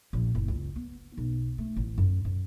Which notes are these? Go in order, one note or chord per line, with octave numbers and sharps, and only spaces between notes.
A#1
F#1
C#2
B3
B1
A3
A1
F#2
F#2